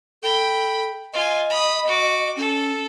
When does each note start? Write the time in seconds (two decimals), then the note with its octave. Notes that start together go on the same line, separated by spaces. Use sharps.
0.23 A4 G5 B5
1.14 F4 D#5 G#5
1.49 B5 D#6
1.87 F#4 D6
2.37 C#4 A4